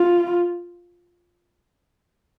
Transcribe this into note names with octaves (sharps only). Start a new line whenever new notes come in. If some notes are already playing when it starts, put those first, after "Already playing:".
Already playing: F4